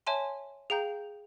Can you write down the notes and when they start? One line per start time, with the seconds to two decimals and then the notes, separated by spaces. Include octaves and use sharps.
0.07 C#5 E5 G#5 A5 C6
0.70 G#4 F5 G5 A#5 G6